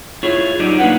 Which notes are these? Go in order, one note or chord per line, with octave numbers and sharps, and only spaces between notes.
E4 F4 G#4 C#5
F#3 D#4 G4 D5
A#3 D4 D#4 B4 F#5